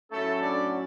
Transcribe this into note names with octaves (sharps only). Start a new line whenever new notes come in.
A2 F#3 A3 C#4 E4 A4
D4 D5